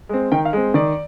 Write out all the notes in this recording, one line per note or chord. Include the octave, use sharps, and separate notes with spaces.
G#3 C4
D#3 G5
F5
G#3 C4
D#3 D5